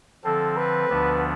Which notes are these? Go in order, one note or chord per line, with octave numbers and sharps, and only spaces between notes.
D3 F3 C4 A4
B4
D2 D3 F3 B3 D4